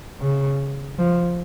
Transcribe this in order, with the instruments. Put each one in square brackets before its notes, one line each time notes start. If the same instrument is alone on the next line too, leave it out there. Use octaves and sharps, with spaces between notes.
[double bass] C#3
F3